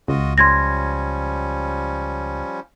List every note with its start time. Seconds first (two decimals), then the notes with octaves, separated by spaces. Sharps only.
0.08 C#2 F4 F#4 D#5
0.38 F3 G3 C#4 C6 G#6 A#6